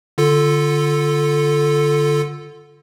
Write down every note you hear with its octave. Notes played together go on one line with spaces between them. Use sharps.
D3 F4 A4